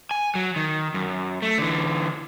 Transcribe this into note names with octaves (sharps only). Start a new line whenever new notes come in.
G#5
F#3
D#3
F#2
A3
D3 E3